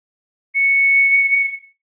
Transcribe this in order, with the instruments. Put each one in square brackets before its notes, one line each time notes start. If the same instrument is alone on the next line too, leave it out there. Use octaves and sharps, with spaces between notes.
[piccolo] C#7